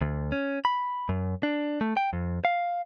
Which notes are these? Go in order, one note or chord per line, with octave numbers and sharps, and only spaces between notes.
D2
C#4
B5
F#2
D4
A3
G5
F2
F5